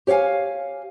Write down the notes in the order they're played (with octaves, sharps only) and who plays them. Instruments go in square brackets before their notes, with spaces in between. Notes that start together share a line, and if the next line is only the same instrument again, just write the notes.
[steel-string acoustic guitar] G4 C#5 D5 F5 G#5